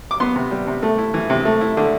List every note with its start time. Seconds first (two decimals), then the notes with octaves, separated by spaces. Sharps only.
0.11 D6
0.20 B3 C6
0.36 C3
0.51 G3
0.67 C3
0.83 A3
0.98 E4
1.14 E3
1.30 C3
1.45 A3
1.61 E4
1.77 D3